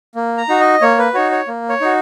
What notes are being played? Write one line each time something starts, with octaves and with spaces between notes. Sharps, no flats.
A#3
A#5
D#4 F#4
D#5
A#3 C#5
B4
D#4 F#4 C#5
C#5
A#3
C#5
D#4 F#4